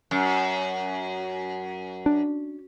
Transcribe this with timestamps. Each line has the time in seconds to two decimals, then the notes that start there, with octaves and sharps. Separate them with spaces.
0.11 F#2
2.06 D4